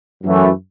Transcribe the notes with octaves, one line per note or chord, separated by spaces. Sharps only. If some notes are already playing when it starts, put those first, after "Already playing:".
F#2 E3 A3